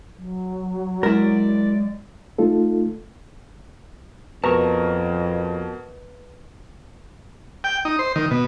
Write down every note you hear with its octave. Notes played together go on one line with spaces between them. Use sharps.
F#3
G#3 E4 A#4 D5
A3 D#4 F4 A4
F2 B2 A#4 B4 A5 A#5 C#6
G5
D#4
C5
D#3
B2